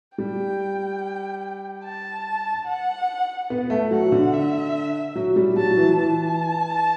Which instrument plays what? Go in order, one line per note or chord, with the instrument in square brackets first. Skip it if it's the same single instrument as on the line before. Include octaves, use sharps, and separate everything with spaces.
[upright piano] G3 [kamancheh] G5
[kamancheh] A5
F#5
[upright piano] B3
A3
[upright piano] F#3 [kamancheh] F#5
[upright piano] D3
[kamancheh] E5
[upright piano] F#3
G3
[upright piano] F#3 [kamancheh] A5
[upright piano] F#3
E3
[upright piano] E3 [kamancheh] A5